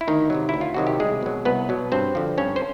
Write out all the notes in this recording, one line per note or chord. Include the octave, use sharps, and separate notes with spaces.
E4
D2 D#3 D#4
C3 D#3 F#3
D2 E4
F4
C3 D#3 F#3 F#4
G4
C2 G#3 G#4
B2 F#3
C2 B3 B4
B2 F#3
G2 C4 C5
D3 F3
G2 C#4 C#5
C5